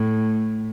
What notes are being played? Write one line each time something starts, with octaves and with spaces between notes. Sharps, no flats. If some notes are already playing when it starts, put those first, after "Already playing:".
Already playing: A2